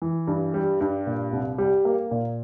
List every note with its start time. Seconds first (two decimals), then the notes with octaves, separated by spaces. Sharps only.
0.02 E3
0.27 G2
0.54 G3
0.81 G2
1.06 A#2
1.33 C2
1.58 G3
1.85 A#3
2.11 A#2